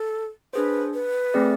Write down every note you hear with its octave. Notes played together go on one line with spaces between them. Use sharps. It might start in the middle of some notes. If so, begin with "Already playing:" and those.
Already playing: A4
D4 G#4 B4 C5
B4
A3 C4 G#4 D5